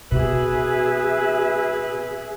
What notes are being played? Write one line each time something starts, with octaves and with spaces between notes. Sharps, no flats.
B2 F#4 G#4 B4 E5